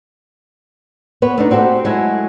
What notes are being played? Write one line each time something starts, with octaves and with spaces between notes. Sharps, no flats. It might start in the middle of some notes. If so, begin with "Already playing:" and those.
B3 B4 C#5
A3 D4 D#4
C4 F#4 G4 A4
F#3 G#3 A3 E4 A4